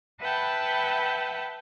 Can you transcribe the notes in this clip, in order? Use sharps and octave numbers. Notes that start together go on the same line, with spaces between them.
B4 E5 F#5 G5 A5 B5